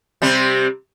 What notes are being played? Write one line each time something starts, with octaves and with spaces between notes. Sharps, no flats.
C3 G3 C4